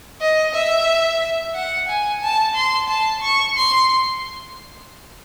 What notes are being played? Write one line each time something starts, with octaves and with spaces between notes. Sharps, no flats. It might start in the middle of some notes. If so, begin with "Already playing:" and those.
D#5
E5
F#5
G#5
A5
C6
A5
C#6
C6